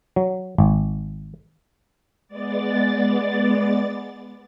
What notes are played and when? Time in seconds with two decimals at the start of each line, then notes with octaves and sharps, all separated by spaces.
0.16 F#3
0.58 G#1
2.28 G#3 B3 D5 A6